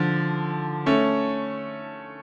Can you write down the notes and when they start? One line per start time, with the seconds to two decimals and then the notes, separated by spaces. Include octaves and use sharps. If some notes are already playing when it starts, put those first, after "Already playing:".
Already playing: D3 F3
0.86 A3 C#4